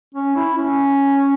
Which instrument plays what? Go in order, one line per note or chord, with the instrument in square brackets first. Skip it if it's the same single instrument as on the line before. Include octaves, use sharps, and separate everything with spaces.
[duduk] C#4
E4
C#4